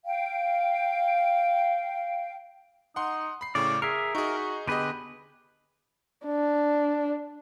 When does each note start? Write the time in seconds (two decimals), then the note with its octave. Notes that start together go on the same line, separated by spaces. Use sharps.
0.05 F5 G5
2.96 D#4 F#5 C6
3.41 B5 C7
3.55 A2 C#3 C#4 D5
3.82 G#4 A#4 E5 C7
4.15 D#4 F#4 G#4
4.67 D3 B3 G4 G#4 B4 D#5
6.26 D4